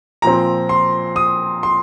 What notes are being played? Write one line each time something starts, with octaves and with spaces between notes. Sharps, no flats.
A#2 F3 C4 A#5
C6
D#6
C6